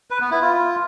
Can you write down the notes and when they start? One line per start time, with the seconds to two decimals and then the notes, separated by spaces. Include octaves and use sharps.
0.11 B4
0.21 B3
0.31 E4
0.41 F4